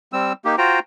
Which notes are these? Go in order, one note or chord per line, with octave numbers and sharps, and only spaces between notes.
G3 C4 E6
A#3 D#4 G4
F4 F#4 C5 G5 A#5